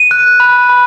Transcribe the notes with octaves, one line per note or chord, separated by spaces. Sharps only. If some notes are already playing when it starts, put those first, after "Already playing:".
Already playing: D#7
F#6
B5
B5